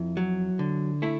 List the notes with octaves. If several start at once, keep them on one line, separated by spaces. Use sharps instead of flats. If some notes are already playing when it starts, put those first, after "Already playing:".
Already playing: F2 E4
F#3
D3
A3 E4